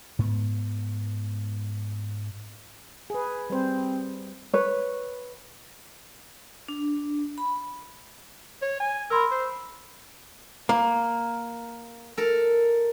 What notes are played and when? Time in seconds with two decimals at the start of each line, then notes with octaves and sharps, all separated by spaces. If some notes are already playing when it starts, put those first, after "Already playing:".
0.19 G#2 B3
3.10 G#4 B4
3.50 G3 C4 C5
4.53 B4 C#5
6.68 D4
7.38 B5
8.62 C#5
8.80 G#5
9.10 A#4 B5 C6 E6
9.31 C5
10.69 A#3
12.17 A4 A#4